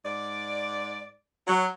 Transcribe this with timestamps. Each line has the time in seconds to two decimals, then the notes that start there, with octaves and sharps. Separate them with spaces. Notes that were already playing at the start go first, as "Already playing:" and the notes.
0.06 G#2 D5
1.48 F#3